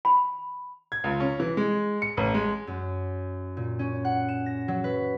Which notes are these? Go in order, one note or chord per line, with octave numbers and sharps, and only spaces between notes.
B5
G#6
C#2
C#4
E3
G#3
C#7
A1
G#3
F#2
A#2
C#4
F#5
E7
A#6
F#3
B4